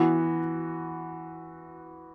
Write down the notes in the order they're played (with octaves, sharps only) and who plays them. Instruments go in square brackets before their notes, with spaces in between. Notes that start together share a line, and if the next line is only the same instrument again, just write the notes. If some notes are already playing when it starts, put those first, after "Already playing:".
Already playing: [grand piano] E3 B3 F#4